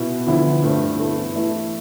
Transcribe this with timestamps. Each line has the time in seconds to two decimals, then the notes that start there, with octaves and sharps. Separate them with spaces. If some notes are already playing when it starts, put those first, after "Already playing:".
Already playing: B2 B3 E4
0.26 D2 D3 F3 B3 E4
0.63 G2 D3 A3 C4
0.98 G2 E3 B3 E4 A4
1.35 E3 A3 E4